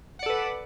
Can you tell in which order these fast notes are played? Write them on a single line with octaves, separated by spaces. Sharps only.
F#5 D5 A4 B4